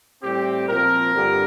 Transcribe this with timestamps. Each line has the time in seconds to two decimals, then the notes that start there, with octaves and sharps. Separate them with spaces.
0.23 A2 G3 C4 G4
0.68 A#2 F3 C4 A#4
1.13 G2 D3 G3